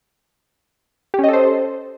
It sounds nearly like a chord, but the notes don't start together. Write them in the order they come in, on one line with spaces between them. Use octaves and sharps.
G4 C#4 D#5 A4 C5